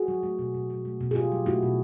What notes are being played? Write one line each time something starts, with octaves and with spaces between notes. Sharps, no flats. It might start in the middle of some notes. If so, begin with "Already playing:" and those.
Already playing: F#4 G#4
F#3
A3
B2
B2
F#3
A3
B2
G#4
B2 F4 G4
F#3
A3 E4 F#4
B2